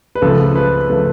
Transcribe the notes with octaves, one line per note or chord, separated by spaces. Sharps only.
B4
C#2 C#3 F3 A3 A4
B4
C#3 F3 A3 B4